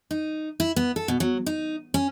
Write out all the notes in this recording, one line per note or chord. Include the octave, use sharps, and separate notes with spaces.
D#4
E4
B3
A4
B2
F#3
D#4
C#4